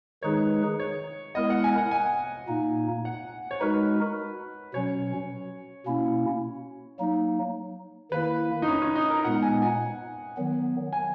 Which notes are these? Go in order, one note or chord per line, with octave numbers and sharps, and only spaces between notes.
D#3 G#3 D#4 G#4 B4 C#5
C#5
G#3 B3 E4 A#4 D#5
F#5
G#5
F#5
G#5
A#2 A#3 D#4
F#5
C#5
G#3 D#4 F#4 A#4 B4
B2 F#3 C#4 C#5
B2 A#3 C#4 E4
F#3 A#3 D#4
D#3 A#3 E4 B4
D#4
C#4
C#4
D#4
A#4
A#2 G#3 B3 D#4 F#5
G#5
G#5
D#3 F#3 B3
G#5